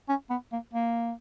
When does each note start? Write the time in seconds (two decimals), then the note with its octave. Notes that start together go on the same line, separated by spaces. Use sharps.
0.09 C#4
0.30 B3
0.52 A#3
0.74 A#3